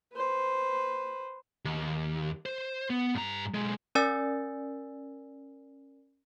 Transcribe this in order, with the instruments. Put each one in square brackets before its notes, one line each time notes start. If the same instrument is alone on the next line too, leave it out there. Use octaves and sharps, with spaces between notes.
[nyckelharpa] B4 C5
[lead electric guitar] D#2
C5
B3
G2 A#5
B1 G#3
[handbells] C#4 A#4 D5 G#5 E6 A6